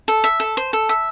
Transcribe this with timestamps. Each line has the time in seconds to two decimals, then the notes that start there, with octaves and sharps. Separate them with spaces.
0.08 A4
0.24 E5
0.40 A4
0.57 C5
0.73 A4
0.89 E5